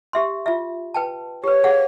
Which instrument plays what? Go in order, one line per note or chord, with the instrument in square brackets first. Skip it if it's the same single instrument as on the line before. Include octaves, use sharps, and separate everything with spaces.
[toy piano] G4 E5 C6
F4 E5
B4 G5 A5
[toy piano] G4 B4 [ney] C#5
[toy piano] G#4 F5 F#5